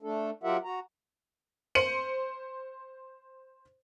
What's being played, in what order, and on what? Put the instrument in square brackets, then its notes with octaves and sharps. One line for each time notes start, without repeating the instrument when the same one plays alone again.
[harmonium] A3 D4 A4
F#3 F4 G4 A#4 E5 F#5
F#4 A#5
[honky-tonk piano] C5 C#7 D#7 F#7